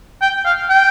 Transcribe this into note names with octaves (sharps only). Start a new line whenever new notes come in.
G5
F5
G5